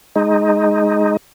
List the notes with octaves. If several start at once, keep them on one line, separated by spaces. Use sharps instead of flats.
G#3 D#4